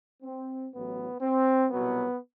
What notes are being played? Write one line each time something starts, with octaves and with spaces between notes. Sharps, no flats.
C4
A1 A2 F#3 B3
C4
C2 B2 F#3 B3